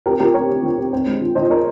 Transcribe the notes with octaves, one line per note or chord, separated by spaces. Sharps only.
C4 G4 A#4
F3 G4 A#4
C4 A#4 C#5
C4
F3
C4
C4
G#3
F3
F3 C5 D#5
F3 A#4 C#5